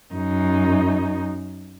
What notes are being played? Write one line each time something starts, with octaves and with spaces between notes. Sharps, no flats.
F#2 D#4